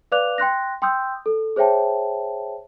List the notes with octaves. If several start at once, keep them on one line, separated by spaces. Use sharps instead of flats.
B4 D5 F5 D6 F#6 F7
G5 C6 F#6 A#6
G5 C6 D#6 E6 G6
A4
G#4 C5 C#5 E5 G5 A5